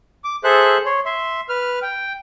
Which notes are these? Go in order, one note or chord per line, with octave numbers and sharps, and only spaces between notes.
D6
G#4 A4 C5 E5 F#6
C#5 C6
E5 C6
B4 F6
G5